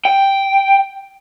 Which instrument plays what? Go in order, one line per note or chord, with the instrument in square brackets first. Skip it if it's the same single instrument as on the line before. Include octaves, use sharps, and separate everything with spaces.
[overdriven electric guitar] G5